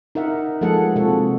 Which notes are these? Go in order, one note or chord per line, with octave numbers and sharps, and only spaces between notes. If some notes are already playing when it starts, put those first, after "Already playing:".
D#4 A#4 E5 F#5
F3 G#3 A#3 G#4 A4 F#5
C3 G#3 F4 F#4 A4